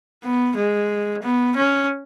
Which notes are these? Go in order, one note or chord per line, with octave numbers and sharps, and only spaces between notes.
B3
G#3
B3
C#4